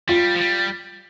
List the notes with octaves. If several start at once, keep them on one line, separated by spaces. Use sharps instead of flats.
G3 F4
F3
G3